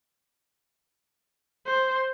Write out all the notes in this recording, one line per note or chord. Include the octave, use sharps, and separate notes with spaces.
C5